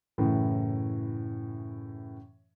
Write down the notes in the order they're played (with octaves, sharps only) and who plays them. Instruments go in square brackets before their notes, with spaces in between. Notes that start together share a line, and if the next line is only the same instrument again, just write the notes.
[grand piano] F#2 A2 C#3 E3